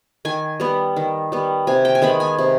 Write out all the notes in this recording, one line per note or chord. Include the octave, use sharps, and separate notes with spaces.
D#3 G#5
G3 B3
D#3
G3 B3
C3 G#5
G5
G#5
D#3 G#3 B3 B5
G#5
C3